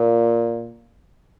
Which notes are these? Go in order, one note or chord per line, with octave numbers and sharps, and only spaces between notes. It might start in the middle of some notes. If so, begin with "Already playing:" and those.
Already playing: A#2